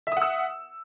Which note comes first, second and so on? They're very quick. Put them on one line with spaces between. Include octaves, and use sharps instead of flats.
E5 D#6 F#5 E6